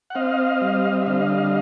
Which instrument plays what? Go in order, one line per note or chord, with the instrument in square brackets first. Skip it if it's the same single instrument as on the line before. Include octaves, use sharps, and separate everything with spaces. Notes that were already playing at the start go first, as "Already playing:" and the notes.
[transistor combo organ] F#5
C4 D#5 F5
G3
E5
D3 D#5 F5